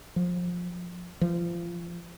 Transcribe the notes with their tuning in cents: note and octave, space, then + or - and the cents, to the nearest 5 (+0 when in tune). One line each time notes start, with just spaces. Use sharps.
F3 +20
F3 -25